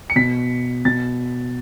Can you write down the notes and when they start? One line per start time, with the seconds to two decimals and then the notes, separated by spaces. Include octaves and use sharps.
0.10 C#7
0.16 B2 B6
0.85 B2 A6